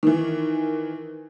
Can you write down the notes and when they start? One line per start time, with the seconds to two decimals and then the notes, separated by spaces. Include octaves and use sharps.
0.03 D#3 E3